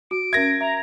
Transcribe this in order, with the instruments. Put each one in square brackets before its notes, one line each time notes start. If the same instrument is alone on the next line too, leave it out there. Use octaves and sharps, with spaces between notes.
[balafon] F#4 [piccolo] D7
[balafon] C#4 A#4 E5 [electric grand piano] G#6 A#6
[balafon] E5 [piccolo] A#5